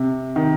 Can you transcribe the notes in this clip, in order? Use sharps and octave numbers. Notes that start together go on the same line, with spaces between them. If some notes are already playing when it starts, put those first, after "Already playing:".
Already playing: C3
D#3